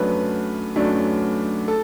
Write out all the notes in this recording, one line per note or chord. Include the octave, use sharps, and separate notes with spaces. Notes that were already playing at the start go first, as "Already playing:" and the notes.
Already playing: F#2 F#3 A3 D4 B4
F#2 F#3 A3 D4
A4